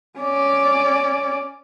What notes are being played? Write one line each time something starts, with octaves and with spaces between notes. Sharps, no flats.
C#4 D5